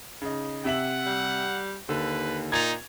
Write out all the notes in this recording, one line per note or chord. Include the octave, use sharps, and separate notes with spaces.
C#3 D#4
C3 E5 F#5 F#7
G3
D#2 D3 B4
A#2 D#4 G#6 A6 F7